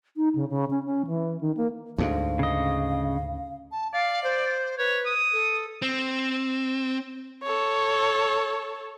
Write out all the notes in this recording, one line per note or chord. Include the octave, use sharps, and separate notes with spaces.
D#4
C#3
C#3
C#4
C#4
E3
D#3
A#3
D2 G#2 F5
C#3 D#5
A5
D5 F5
C5
B4 C#5
D#6
A4
C4
A4 C#5